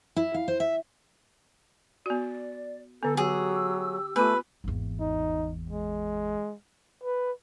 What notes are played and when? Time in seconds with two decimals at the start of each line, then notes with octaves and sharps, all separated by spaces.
0.16 E4
0.34 F5
0.48 C5
0.60 E5
2.06 B3 F#4 D5
3.03 D3 B3 A4
3.17 F#3 G4 G#4 E6
4.16 A3 B3 F4 B4
4.64 G#1 E2
5.00 D#4
5.70 G#3
7.04 B4